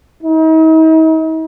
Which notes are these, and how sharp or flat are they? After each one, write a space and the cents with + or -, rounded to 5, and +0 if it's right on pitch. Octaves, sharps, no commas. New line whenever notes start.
D#4 +45